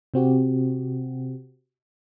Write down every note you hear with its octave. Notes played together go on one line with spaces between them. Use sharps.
C3 C4 F#4 G4